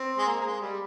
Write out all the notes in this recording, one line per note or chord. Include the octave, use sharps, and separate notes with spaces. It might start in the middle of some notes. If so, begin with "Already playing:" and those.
Already playing: C4
G#3
A#3
A#3
G#3
G3